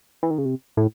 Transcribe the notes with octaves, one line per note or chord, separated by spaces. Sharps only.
E3
D#3
C#3
C3
A2